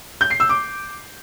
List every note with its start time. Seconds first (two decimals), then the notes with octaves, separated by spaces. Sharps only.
0.21 G6
0.30 C7
0.40 E6
0.49 D6